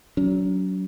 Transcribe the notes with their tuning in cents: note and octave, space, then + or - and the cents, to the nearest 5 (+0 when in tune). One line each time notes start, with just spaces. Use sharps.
F#3 +15 C#4 +45